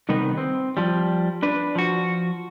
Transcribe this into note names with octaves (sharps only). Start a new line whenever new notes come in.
C2 D#3 B3 D#4 B4
C4
F3 G3
D4 B4
F3 F#4